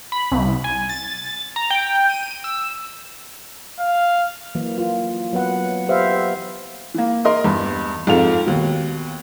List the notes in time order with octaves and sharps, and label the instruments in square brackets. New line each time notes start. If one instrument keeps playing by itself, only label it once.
[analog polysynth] B5
C2
G#5
A6
A#5
G5
D#7
E6
[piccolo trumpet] F5
[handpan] E3 F#3 A#3
F4
F#3 B3 B4 F#5
G4 A4 B4 C5 E5 F5
[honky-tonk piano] E3 A#3
A#4 D#5 C6
E2 G2
F2 G#2 F4 A4 F7
D#2 B2